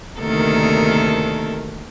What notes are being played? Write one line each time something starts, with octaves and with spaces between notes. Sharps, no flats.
D2 C3 D#3 A#3 A4 A#4